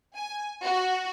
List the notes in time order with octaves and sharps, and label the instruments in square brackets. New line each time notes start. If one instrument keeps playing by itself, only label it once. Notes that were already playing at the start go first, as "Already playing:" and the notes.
[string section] G#5
F#4